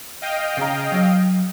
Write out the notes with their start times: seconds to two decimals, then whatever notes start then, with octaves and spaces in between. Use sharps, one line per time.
0.21 D#5 F5 G5
0.57 C#3 A#5
0.92 F#3